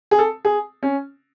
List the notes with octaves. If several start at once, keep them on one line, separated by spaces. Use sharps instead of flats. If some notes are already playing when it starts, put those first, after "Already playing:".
G#4
A4
G#4
C#4